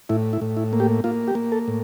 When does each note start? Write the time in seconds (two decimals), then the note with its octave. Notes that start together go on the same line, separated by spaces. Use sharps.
0.09 A2 E4
0.33 E4
0.41 A2
0.57 E4
0.73 A#3
0.80 G4
1.04 A#3 F4
1.28 G4
1.35 A#3
1.52 A4
1.68 A2